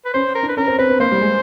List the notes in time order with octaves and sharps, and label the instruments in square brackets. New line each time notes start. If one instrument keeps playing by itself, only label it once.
[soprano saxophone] B4
[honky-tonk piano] C#4 [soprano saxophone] C5
[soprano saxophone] A#4
[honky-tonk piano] D4
[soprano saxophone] B4
[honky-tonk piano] C#4 [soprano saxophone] A#4
[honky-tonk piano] C4
[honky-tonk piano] C4 [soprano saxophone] B4
[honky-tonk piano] B3
[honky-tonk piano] A#3 [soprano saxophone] C5
[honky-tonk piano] G3
G#3